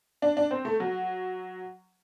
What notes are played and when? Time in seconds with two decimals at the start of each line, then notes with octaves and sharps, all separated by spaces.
0.22 D4
0.37 D4
0.51 C4
0.65 A3
0.80 F#3